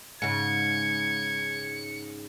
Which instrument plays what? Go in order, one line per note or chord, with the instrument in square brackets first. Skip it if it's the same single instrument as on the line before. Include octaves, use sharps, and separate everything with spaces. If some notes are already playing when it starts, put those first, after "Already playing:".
[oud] G#2 C#3 [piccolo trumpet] G#6 [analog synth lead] C#7